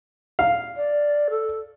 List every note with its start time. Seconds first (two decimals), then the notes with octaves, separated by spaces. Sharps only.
0.39 F5
0.77 D5
1.30 A4